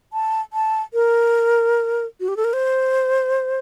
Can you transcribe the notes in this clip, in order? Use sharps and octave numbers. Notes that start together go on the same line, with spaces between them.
A5
A5
A#4
F#4
G4
A4
A#4
C5